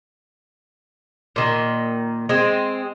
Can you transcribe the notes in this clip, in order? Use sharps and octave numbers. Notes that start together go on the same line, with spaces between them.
A#2 D#3
G#3 C4